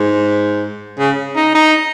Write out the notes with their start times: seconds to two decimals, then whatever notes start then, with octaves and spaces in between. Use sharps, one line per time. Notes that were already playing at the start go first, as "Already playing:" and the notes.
Already playing: G#2
0.98 C#3
1.36 D#4
1.55 D#4